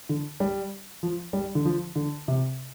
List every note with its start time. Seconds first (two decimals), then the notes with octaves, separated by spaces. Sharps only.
0.09 D3
0.40 G3
1.03 F3
1.33 G3
1.55 D3
1.65 F3
1.96 D3
2.28 C3